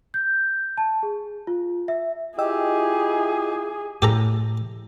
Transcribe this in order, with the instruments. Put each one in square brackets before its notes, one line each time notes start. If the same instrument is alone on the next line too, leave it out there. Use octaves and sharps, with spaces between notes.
[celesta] G6
A5
G#4
F4
E5
[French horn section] E4 F4 [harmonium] G4 [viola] G#4 [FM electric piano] D#5 G5 E6
[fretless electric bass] A2 [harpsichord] G4 A4 A#5